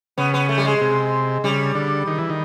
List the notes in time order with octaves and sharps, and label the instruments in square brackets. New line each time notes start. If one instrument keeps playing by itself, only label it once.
[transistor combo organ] C#3 [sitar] B3
[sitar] B3
A3
G3
G#3
[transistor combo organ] C3
[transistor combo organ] C#3 [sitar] G3
[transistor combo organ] D3
D#3
E3
D#3